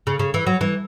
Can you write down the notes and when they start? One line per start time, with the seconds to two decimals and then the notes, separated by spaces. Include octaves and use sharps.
0.07 C#3
0.19 C#3
0.34 E3
0.47 F#3
0.61 E3